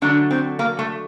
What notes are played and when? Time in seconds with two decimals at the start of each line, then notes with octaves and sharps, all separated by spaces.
0.02 D3 F#3 A3 D4
0.31 C4
0.59 A#3
0.79 A3